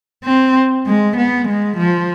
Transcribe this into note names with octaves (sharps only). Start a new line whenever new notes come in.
C4
G#3
B3
G#3
F3